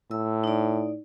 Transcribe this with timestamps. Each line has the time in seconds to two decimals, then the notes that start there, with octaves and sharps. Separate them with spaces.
0.11 A2 E6
0.44 D#4 D5